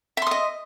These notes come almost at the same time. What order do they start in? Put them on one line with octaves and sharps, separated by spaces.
E5 C6 D#6 D#5